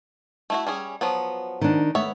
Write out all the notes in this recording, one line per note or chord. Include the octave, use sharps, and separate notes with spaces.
A3 E4 F#4
G3 C#4 G#4
F3 F#3 B3
D#3 D4
A3 B3 C#5 E5